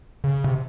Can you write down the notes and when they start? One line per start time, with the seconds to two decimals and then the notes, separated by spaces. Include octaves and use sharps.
0.24 C#3
0.44 C3